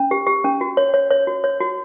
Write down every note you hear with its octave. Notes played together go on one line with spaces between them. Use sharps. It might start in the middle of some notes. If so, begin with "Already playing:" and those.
Already playing: C#4
G4
G4
C#4
F#4
C#5
C#5
C#5
F#4
C#5
F#4